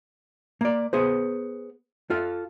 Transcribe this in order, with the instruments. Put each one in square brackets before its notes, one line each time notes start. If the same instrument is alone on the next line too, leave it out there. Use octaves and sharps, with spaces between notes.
[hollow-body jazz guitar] A#3 D5
B3 G#4 C5
F4 A4 F5